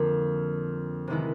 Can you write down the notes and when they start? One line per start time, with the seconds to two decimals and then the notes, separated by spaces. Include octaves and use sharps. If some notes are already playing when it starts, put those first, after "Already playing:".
Already playing: F2 D3 F3 A#3 D4
1.07 C3 D#3 G#3 B3 E4